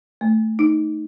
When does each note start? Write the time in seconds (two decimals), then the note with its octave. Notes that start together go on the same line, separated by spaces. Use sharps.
0.21 A3
0.59 D#4